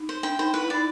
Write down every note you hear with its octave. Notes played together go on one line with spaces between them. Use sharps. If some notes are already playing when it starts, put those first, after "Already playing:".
Already playing: D#4
C5
D4 G5
D#4 C5
E4 B4
E4
D#4 D5